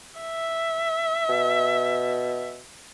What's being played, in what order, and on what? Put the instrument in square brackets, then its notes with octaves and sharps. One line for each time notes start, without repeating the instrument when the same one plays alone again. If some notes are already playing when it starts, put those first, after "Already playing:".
[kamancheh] E5
[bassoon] B2